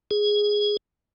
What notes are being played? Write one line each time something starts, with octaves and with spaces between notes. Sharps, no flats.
G#4